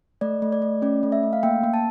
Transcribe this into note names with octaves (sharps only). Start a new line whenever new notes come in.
A3 D5
A3
D5
A3
C#4 D5
A3
E5
A3
F5
A#3 G5
A#3
A5